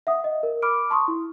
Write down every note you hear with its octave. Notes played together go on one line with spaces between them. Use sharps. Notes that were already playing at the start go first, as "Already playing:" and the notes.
E5 F#5 D#6
D#5
A#4
B5 D6 F6 D7
A5 C6 C#6 D#6
E4